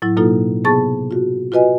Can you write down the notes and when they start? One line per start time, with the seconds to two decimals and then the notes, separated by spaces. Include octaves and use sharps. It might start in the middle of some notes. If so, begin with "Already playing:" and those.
0.02 A2 F#3 E4
0.17 B2 F#3 A#3 D#4 F4 A4
0.65 C3 B3 G#4 A5 C#6 A6
1.11 F4 F#4
1.52 F4 F#4 B4 D#5 G#5